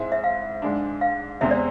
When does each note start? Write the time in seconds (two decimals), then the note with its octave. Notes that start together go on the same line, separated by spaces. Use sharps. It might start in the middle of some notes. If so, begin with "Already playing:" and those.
Already playing: G#2 G#3 C4 E4
0.12 E5
0.24 F5
0.62 G#2 G#3 D4
1.01 F5
1.41 E2 C3 G#3 C4 E5
1.51 D5